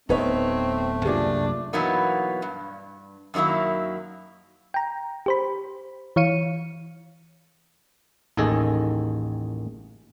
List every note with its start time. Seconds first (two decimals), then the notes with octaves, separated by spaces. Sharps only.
0.09 D1 D2 A3 B3 C4 D#4 B4 C#5
1.05 C2 F#2 A#3 D4 F4 G4 G#4
1.73 B2 E3 F#3 A#3 B3 D#4
2.42 G2
3.34 F#2 D#3 F#3 A#3 E4
4.74 G5 A#5
5.26 G4 C5 B5
6.16 E3 C#5 F5 C#7 D#7
8.37 A1 D#2 D#3 G#4 A4 D#5